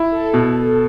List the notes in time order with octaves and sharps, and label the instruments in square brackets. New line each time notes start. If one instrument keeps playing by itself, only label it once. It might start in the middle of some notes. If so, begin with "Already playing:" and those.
Already playing: [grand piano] E4
[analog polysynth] A4
[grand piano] B2